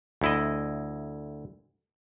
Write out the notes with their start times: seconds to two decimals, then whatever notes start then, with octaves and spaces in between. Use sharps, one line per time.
0.21 D2 E4 D#5